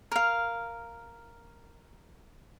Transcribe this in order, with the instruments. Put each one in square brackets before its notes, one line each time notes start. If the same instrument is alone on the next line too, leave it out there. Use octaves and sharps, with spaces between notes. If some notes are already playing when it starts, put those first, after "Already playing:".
[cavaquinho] A#4 F5